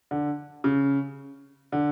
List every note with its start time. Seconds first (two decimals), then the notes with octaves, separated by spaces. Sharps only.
0.11 D3
0.64 C#3
1.72 D3